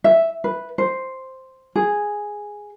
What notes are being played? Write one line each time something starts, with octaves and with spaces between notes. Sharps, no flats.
E5
B4
C5
G#4